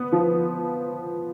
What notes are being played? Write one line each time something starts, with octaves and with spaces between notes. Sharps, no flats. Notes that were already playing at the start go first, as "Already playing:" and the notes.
Already playing: B3
F3